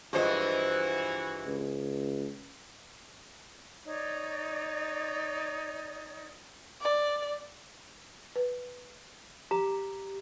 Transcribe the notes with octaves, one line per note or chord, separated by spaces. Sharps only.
G2 E3 F3 G#3 F#4 C5 D#5
C#2
D#4 C#5 D5
D5
B4
G4 A#5